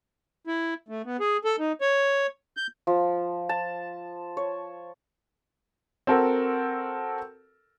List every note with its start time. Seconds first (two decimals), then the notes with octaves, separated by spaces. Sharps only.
0.47 E4
0.89 A3
1.05 B3
1.20 G#4
1.45 A4
1.59 D#4
1.81 C#5
2.57 G6
2.87 F3
3.49 A5
4.37 C#5
6.07 C4 F#4 A4 A#4